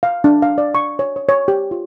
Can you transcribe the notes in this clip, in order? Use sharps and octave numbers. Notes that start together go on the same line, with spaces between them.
F5
D4
F5
D5
C#6
C#5
C#5
C#5
G4
F4